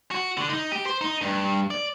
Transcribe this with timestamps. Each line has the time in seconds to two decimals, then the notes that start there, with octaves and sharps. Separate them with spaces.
0.11 F#4
0.37 D3
0.49 D#4
0.72 G4
0.86 C5
1.01 D#4
1.21 G2
1.70 D5